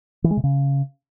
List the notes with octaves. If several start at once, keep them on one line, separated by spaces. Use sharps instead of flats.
E3
G#3
C3
C#3